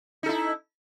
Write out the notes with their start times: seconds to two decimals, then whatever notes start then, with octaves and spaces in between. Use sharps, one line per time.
0.23 D#4
0.26 A4
0.29 E4